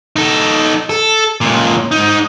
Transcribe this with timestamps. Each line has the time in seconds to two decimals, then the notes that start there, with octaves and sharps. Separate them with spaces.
0.16 D#4 A4
0.90 A4
1.41 C#2 A#2
1.91 G#2 D#4